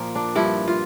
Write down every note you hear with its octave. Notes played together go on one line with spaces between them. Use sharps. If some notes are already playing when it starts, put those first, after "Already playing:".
Already playing: A#2 F3 A#3
D4
G2 F3 E4
F4